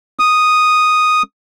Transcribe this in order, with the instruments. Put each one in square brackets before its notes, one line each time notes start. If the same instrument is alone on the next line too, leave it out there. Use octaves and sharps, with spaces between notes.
[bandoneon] D#6